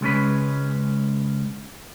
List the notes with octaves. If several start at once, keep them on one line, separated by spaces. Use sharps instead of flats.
C#2 G#3 C#4 B4